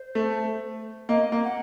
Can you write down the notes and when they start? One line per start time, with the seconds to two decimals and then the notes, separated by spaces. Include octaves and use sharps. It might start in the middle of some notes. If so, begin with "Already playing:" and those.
Already playing: C5
0.15 A3
1.09 A#3 D#5
1.32 A#3
1.44 F#5